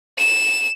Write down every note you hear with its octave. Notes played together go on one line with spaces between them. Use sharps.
E7